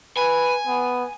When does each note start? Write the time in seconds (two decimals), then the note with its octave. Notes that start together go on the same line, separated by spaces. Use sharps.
0.17 B4 G#5
0.67 B3